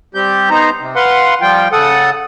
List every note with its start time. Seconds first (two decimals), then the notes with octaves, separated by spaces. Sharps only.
0.15 G3 C4 G4 G6
0.50 B3 D#4 C5 A#5
0.80 C3
0.96 B4 F5 F#5 C6
1.41 F3 G3 F4 G5
1.72 C#3 A4 F#5 D#6